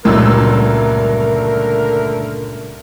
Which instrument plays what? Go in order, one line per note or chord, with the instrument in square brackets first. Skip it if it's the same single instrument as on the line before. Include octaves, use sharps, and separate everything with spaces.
[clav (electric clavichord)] C#2 A#2 [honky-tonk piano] G2 F#3 E6 [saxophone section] D3 A3 A#4